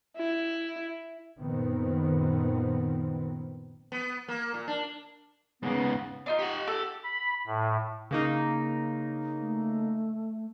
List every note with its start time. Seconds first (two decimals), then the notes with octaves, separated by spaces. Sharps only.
0.16 E4
1.38 F#1 A#2 D#3 B3 C4
3.92 B3
4.28 A#3
4.54 A#2
4.68 D4
5.63 G#2 C#3 A#3 B3
6.26 D4 D#4 F4
6.39 G4 F#5
6.67 A4
7.04 B5
7.47 A2
8.11 C#3 A#3 D#4
9.41 A3